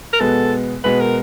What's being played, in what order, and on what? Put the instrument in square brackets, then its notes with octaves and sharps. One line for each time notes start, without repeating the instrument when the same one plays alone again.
[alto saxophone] A#4
[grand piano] B2 G#3 B3 [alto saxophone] A4
[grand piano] B2 G#3 B3 [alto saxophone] B4
[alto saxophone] A#4